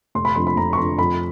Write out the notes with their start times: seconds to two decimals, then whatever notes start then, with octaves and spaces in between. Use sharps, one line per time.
0.15 F1 C6
0.25 B5
0.35 F2 D3 C6
0.47 B5
0.56 F1 A#5
0.73 C#6
0.77 F2 D3 C6
0.98 F2 B5